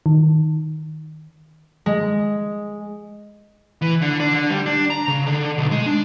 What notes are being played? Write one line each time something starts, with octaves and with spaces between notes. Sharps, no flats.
D#3
G#3
E3
D3
D4
D3
G3
D4
A#5
C#3
D3
B1
G#3
D4